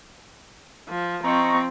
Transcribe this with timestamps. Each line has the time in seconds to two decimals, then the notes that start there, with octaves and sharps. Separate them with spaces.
0.88 F3
1.24 F3 C4 D#5 A#5 C#6